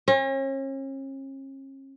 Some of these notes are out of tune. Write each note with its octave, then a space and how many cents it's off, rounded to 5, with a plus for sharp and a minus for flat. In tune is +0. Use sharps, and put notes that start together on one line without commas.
C#4 -40